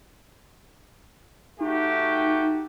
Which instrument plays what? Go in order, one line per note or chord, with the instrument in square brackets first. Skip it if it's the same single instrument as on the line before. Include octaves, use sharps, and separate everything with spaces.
[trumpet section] A3 F#4 G4 [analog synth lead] D#4